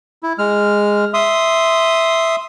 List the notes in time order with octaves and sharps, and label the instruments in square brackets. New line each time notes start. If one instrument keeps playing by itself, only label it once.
[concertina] E4
G#3 F6
E5 C6 D#6